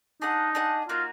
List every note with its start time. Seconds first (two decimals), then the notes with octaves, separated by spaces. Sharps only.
0.22 D4 D#4 G#4 D#5 F#5
0.55 D4 G#4 D#5 F#5
0.89 A#3 D#4 F4 F#4